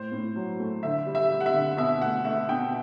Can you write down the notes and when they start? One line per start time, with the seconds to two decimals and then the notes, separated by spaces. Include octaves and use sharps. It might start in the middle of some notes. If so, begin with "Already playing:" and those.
Already playing: A2 C5
0.12 A2
0.36 F#3
0.60 A3
0.83 D3 E5
1.06 G3
1.15 E5
1.31 G3
1.40 F#5
1.46 E5
1.54 D3
1.77 B2 E5
2.01 A3 F#5
2.25 A3 E5
2.49 B2 G5